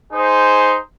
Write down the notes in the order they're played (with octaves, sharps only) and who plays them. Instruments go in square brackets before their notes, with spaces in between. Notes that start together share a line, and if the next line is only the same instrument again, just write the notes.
[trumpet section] D#4 G#4 C5